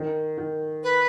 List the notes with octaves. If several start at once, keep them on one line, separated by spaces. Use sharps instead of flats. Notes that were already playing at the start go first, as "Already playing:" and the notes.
Already playing: D#3
D#3
B4